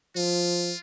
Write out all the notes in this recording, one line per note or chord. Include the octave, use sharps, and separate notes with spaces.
F3 F4